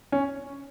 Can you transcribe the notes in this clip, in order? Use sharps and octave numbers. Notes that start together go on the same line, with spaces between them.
C#4